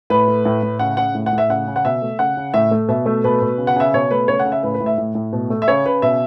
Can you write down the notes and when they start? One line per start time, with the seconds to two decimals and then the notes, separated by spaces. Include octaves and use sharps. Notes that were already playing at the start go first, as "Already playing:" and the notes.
0.10 A2 B4
0.28 A3
0.45 A2
0.63 A2
0.79 C#3 F#5
0.97 C#3 F#5
1.15 A2
1.26 F#5
1.32 A2
1.38 E5
1.49 C#3 F#5
1.67 C#3
1.76 F#5
1.85 B2 E5
2.02 A3
2.19 C#3 F#5
2.37 C#3
2.54 A2 E5
2.71 A3
2.88 B2 E5
3.06 A3
3.24 B2 B4
3.42 B2
3.58 C#3
3.67 F#5
3.76 C#3 E5
3.94 B2 C#5
4.11 A3 B4
4.28 C#3 C#5
4.39 F#5
4.45 C#3
4.52 E5
4.63 A2 B4
4.74 B4
4.80 A2
4.86 E5
4.98 A2
5.15 A2
5.33 B2
5.50 A3
5.62 E5
5.68 C#3 C#5
5.85 C#3 B4
6.02 B2 E5